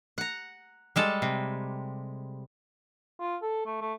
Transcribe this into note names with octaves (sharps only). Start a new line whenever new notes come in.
F#5 A#5
G3 G#3 A4
C3
F4
A4
A3
A3